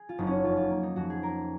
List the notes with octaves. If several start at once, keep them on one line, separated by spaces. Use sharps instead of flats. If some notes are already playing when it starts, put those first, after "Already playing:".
Already playing: G#4
F4
F#1 D#4
C#4
F2 F4
F4
A#3
D#4
F2 F#4
G#4
A#3 A#4